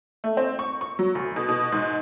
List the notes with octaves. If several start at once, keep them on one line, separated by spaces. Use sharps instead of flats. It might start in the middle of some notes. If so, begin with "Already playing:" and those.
A3
C4
C#6
C#6
F#3
D2
B2
B2
G#2